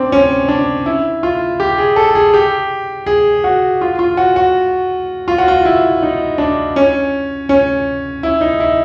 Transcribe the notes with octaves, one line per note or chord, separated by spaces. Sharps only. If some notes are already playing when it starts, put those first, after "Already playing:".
Already playing: C4 D4
C#4
D4
E4
F4
G4
G#4
A4
G#4
G4
G#4
F#4
F4
F4
F#4
F#4
F4
F#4
F4
E4
D#4
D4
C#4
C#4
E4
D#4
E4